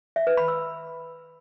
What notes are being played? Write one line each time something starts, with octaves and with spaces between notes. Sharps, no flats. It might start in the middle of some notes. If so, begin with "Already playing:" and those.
E5
B4
B5
E6